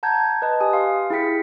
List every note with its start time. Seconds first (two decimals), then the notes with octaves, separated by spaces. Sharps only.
0.03 F#5 A5 A#5 G6 G#6
0.42 B4 D#5 A5
0.60 G4 G#5 D#6
0.73 F5 C6
1.10 E4 G#4 G5 B6 C#7